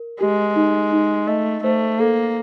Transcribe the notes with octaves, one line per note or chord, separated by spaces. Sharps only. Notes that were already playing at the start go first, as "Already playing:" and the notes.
Already playing: A#4
G#3 G4
D#4
D#4
A3 D#5
A3 C5
A#3 A4